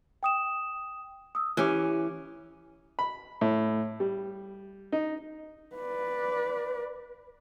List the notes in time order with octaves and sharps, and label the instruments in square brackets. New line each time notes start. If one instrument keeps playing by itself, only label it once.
[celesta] G5 D#6 E7
D#6 E6
[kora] E3 C#4 [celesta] E4 G4 D6
[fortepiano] B5
A2
G3
D#4
[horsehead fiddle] B4 D5